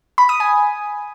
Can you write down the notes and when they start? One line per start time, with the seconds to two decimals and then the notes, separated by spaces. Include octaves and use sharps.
0.18 B5
0.29 D#6
0.40 G#5